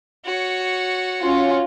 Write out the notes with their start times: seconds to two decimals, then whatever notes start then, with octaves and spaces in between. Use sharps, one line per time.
0.24 F#4 C#5
1.21 C#4 F4